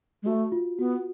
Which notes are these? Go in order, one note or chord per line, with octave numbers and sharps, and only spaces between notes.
G#3
A3 F#4
F4
B3 F#4